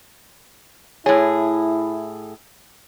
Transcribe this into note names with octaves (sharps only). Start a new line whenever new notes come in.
A2 E4 G#4 C#5